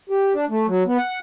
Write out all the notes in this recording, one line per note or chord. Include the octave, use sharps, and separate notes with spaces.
G4
D4
A3
F#3
B3
F#5